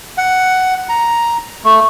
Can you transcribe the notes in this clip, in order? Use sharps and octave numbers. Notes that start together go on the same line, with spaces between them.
F#5
A#5
A3